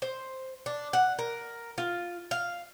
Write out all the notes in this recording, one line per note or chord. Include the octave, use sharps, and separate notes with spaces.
C5
D4
F#5
A#4
F4
F5